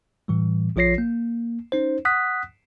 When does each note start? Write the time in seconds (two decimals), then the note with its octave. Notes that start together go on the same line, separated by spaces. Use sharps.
0.28 A2 E3 G3
0.76 A#1 F3 F4 C#5 A#6 C7
0.98 A#3
1.72 C#4 D#4 C5
2.05 F#5 D#6 F#6 B6